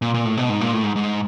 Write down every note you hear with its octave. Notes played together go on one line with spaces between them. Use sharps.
A#2
A#2
A2
B2
G#2
A#2
A2
G#2
G#2